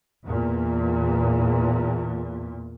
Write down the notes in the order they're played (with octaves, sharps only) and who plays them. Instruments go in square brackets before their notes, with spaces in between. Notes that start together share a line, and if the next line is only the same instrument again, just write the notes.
[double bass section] E2 A#2